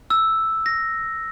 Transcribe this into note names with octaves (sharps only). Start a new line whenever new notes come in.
E6
A#6